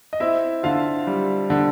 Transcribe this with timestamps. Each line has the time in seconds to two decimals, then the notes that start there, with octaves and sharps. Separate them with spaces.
0.13 D#5
0.20 C4 E4 E5
0.63 D3 F4 F5
1.07 G3
1.50 D3